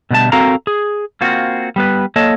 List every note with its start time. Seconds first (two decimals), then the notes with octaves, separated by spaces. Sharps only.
0.11 B2 D3 G3 A3 A5
0.32 C4 F#4 A4 A#4 F5 A#5
0.67 G#4
1.21 A#3 C4 F4 F#4
1.76 G3 B3 B4
2.16 A#3 A4 C#5 D#5 A5